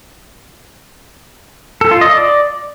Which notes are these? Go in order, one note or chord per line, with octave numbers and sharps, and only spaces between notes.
A4
F4
D#5
D5